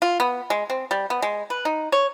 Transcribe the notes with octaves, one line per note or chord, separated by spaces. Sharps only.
F4
B3
G#3
C4
G3
B3
G#3
B4
D#4
C#5